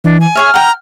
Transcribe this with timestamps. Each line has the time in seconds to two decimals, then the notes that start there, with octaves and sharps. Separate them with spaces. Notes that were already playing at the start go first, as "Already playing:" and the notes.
0.04 E3 D4
0.21 G#5
0.35 G#4 C#5 E5 F6
0.54 F#5 G5 A#5